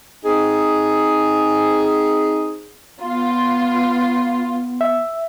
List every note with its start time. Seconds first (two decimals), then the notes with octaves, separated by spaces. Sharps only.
0.24 C4 D#4 G#4
3.02 B3 F4
4.81 E5